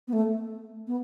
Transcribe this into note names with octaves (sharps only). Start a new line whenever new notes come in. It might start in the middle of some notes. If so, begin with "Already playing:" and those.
B3
A3
B3